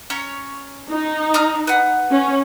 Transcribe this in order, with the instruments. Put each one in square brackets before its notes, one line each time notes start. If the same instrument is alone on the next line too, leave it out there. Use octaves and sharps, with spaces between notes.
[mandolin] C#4 C#5 A#5
[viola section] D#4
[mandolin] A#5 D#6 F6
B4 F#5
[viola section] C#4